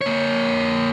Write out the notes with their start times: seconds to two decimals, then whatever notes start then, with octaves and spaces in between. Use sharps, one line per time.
0.01 A#3 C#5